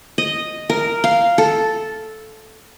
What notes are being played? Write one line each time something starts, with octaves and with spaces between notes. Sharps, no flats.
D#5
A#4
F5
A4